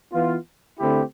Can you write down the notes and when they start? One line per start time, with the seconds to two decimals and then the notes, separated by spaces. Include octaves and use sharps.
0.13 E3 B3 F4
0.79 D3 A3 C4 E4 G4